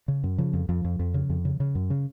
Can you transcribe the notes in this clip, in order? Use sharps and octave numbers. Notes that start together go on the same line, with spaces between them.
C#3
F#2
C#3 F3
F2
F2 F3
F2
F2
C#3
F2
C#3
C#3
F#2
C#3